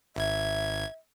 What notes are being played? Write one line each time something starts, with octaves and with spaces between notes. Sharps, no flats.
G#1 E5 G#6